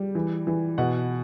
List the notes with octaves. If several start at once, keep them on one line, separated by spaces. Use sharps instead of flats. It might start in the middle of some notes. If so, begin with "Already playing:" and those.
Already playing: G3
E3
E3
B2 F#5